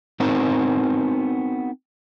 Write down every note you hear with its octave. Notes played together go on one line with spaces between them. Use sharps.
B3 C4 D#4 F#4 A#4 C5